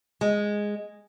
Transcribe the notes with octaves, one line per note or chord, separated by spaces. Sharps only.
G#3